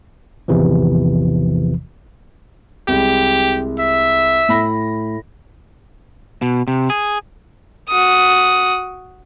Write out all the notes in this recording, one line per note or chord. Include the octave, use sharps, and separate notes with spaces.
G#1 E2 C3 E3 F3
C2 G#3 G4
E5
A2 B5 A#6
B2
C3
G#4
F#4 D#6